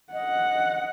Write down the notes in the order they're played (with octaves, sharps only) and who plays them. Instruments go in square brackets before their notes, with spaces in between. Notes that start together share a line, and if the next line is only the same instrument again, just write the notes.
[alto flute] D#5 [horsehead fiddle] F#5